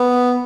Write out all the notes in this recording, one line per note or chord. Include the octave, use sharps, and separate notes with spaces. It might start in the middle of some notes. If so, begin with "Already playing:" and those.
Already playing: B3